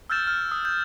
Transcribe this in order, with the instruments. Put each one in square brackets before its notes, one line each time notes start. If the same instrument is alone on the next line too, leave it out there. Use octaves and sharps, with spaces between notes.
[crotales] E6 F6 G6 A6 E7
F6
D#6
G6